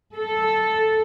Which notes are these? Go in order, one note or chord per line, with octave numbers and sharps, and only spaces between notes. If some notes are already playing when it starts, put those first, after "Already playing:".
A4